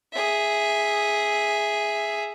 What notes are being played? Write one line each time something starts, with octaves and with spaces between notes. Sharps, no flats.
G#4 E5